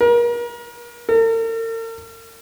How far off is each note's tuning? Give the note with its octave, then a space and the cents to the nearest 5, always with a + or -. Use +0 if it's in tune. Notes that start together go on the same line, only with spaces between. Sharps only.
A#4 +35
A#4 -45